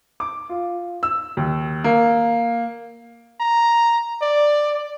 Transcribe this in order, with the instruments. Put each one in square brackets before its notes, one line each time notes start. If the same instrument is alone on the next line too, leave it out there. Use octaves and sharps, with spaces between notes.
[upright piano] D6
F4
E6
D#2
A#3
[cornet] A#5
D5